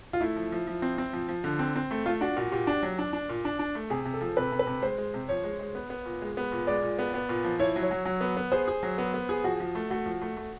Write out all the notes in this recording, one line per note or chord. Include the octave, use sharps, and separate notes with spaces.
F4
A3 E4
F3
F3
F3
C4
C4
F3
F3
D3
C4
C4
A3
A3 F4
D4 F#4
A#2 F#4
A#2 G4
D4
F#3
D4
D4
A#2
D4
D4
A3
C3 G#4
C3
A4
F3
C3 B4
C3
B4
C3
G#3 C5
G#3
C3
F3 C#5
G#3
G#3
B3
B3
A#2
G#3
B3
A#2
G#3 D5
A#2
B3
B3
A#2
F3
E4 C#5
F#3
C#5
F#3
F#3
B3
B3
G#4 C5
G#4
F#3
B3
B3
G#4
F3 F#4
F3
A3
A3 F#4
F3
A3
A3